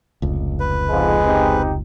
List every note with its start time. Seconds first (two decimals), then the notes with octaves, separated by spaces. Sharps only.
0.22 F1 C#2
0.60 B4
0.90 F2 G#2 F3 G#3
1.25 C4 D#4 G4